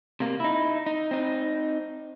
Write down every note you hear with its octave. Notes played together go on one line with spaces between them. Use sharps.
C3 A#3
D#4 E4
D#4
C4 D#4